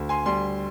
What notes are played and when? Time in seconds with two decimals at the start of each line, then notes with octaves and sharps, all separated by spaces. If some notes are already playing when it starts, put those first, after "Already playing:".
Already playing: D2
0.09 G#5 C6
0.25 G3 G#5 C6